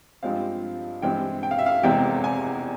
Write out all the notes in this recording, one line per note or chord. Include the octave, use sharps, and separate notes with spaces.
G2 F3 G#3 C4 F5
G2 E3 G#3 C4 G5
G5
F5
E5
F5
F1 E2 E3 G#3 C4 G5
G#5